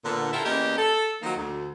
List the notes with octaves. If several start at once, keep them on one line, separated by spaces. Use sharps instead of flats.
A#2 D3 B3
E4 F4 G4 A4 A#4 E5
E2 A#3 C#4 G4 A#4 D#5
A4
D#3 F3 F#3 A#3 D#4
D2